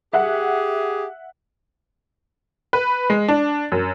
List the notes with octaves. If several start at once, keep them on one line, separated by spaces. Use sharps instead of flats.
G4 G#4 E5 F#5
B4
G#3
D4
F#2